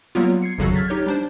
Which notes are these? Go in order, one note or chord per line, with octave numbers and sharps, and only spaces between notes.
F#3 G3 A#3 B3 F4
G#6 C7 C#7
G#1 F2 C#3 F#3 F#4 A4
F6 G#6 A6 B6
D#4 G4 C#5 F6 G6 G#6
G3 D4 C5